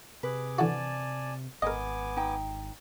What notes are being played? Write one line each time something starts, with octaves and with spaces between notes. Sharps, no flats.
C3 G#4 B4 D6
D3 E3 F#4 D5 G#5 A5
G#1 B3 A#4 D#5 G#5 D6
D#4 G5